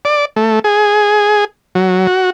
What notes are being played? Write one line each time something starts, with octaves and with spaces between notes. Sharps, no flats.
D5
A3
G#4
F#3
F#4